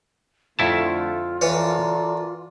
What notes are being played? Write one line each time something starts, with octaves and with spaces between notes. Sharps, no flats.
F2 D3 A3 E4 F4 A5
E3 A4 A#4 C#5 D5